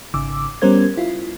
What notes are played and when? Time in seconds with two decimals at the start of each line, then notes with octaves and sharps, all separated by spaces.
0.14 G#1 C#3 D6 E6
0.62 G3 B3 C#4 A#4 C5 G#6
0.97 E4 F4